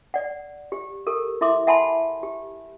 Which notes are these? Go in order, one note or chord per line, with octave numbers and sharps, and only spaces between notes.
D5 F#5
G4
G4 A4 A#4
E4 E5 C6 D6
E5 F#5 G#5 A5 B5 C6
G4